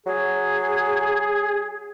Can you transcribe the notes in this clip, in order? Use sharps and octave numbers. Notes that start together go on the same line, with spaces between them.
F#3 G#4